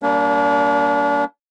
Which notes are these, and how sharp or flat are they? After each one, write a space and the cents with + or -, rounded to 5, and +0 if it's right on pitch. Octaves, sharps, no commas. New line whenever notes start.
G3 +0 A#3 +0 D4 -35